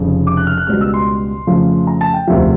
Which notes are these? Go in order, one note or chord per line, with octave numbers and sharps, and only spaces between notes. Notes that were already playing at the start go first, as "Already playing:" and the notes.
Already playing: F1 F2 C#3
D6
F#6
F6
F#6
C#2 B2 G3 F6
E6
C6
F2 C#3 F3 A3
A#5
A5
G5
E1 D2 C3 F3 E5